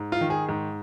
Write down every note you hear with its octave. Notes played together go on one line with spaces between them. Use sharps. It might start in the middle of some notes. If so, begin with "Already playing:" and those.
Already playing: G#2
F4
D#3
G#4
G#2